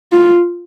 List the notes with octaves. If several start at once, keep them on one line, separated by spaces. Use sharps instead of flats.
F4